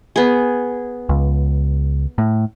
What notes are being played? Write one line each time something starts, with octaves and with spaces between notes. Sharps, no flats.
B3 G#4
C#2
A2